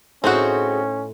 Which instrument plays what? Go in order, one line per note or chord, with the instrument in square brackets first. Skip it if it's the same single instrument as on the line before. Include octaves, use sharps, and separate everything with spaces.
[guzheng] A2 D#4 C5 [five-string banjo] C4 F#4 [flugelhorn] C#4 [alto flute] G#4